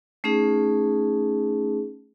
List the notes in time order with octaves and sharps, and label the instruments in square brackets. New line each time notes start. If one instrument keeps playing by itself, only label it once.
[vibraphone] A3 C#4 D#4 G#4